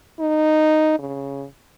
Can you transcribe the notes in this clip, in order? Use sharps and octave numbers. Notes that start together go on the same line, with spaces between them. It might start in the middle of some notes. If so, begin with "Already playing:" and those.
D#4
C#3